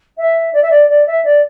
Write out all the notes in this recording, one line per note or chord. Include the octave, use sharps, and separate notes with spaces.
E5
D5
E5
D5
D5
E5
D5